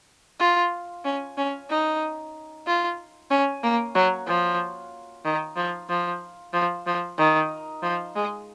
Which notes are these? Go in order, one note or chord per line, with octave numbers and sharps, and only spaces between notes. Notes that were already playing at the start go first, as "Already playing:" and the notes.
F4
C#4
C#4
D#4
F4
C#4
A#3
F#3
F3
D#3
F3
F3
F3
F3
D#3
F3
G#3